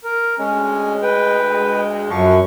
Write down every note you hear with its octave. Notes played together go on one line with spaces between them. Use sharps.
A#4
D2 G#3 C#4
B4 G5
F#2 D3 F3 F#3 C#6